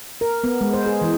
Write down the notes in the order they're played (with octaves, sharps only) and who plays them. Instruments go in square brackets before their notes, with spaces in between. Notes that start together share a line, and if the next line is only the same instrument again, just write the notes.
[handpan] A#4
B3
G#3
C5
G#4
E3